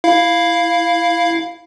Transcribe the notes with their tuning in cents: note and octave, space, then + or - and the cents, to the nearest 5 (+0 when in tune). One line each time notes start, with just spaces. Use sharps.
E4 +0 F5 +0